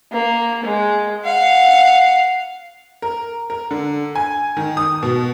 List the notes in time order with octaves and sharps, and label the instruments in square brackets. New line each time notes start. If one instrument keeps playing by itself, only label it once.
[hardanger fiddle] A#3
G#3
F5 F#5
[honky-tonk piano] A#4
A#4
D3
G#5
D#3
D#6
B2